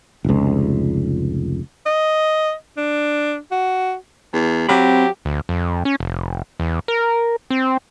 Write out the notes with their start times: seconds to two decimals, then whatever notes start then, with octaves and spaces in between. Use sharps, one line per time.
0.25 F1 C#2
1.86 D#5
2.77 D4
3.52 F#4
4.33 E2
4.69 F#3 C4 G4 F5 B5
5.25 D2
5.49 F2
5.85 C#4
6.00 F1
6.60 E2
6.88 A#4
7.50 C4